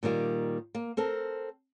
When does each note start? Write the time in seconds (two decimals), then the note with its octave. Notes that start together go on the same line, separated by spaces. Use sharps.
0.03 A#2 D#3 G3 A#3
0.75 A#3
0.97 C4 A4 A#4